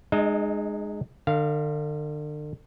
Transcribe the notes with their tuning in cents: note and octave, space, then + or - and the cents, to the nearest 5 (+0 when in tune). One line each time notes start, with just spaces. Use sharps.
G#3 +0 D#4 -35 D#5 +35
D3 +40 F5 -10